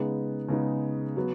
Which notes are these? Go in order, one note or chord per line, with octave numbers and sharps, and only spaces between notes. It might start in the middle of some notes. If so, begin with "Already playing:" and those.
Already playing: C#3 G#3 B3 D#4
C#3 G#3 B3 D#4
F#3 B3